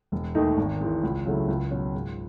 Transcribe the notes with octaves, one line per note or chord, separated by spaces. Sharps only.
E1
D#2 D#3 A3 D#4
G#1
G#2 E3
C#2
C#3 F#3 A3 E4
C#2
B2 F#3 C#4
G#2